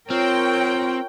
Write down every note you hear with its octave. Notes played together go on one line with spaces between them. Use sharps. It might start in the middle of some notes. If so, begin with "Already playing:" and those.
C4 F4 A#4 C#5 G5